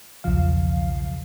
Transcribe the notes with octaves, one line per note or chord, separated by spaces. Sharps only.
B1 E2 C#3 F3 F5